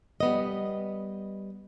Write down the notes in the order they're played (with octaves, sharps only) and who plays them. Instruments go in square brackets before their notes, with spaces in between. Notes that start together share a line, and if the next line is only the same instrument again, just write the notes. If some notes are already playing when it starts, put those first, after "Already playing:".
[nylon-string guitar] G3 B3 D#5